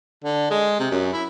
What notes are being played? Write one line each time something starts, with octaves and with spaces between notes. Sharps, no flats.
D3
G#3
C3
F#2
E4